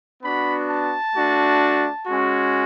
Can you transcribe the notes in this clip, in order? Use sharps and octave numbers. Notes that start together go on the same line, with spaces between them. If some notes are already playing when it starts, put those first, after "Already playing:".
B3 D4 F#4 B5
A5
A3 D4 F#4
G#3 C#4 F#4